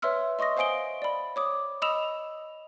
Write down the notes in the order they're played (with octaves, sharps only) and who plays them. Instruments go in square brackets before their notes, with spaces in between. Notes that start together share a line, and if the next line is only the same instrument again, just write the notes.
[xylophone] B4 C#5 E5 C6 E6 F6
D#5 C6 C#6 D#6 A#6
C5 F5 G#5 D#6 D7 G7
D5 B5
C#5 D6 D#6
D#5 B5 D#6 E6 E7 F7